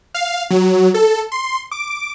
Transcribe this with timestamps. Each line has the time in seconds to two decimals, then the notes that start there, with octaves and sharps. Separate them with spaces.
0.14 F5
0.50 F#3
0.94 A4
1.32 C6
1.72 D6